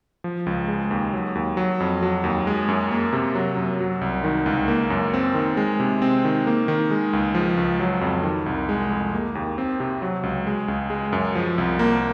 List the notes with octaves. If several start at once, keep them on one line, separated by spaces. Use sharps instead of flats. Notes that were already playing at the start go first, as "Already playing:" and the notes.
F3
C#2
G#3
D#2
F#3
D#2
F#3
F2
F#3
D#2
G#3
F#2
A#3
C3
F#3
F#2
F#3
C2
D#3
C#2
A#3
F#2
C4
D#3
G#3
C3
C4
D#3
A#3
D#3
G#3
C#2
F3
C#2
F#3
F2
D#3
C2
G#3
F2
A#3
D#2
C4
C3
F#3
C#2
G#3
C#2
G#3
F#2
F3
C2
A#3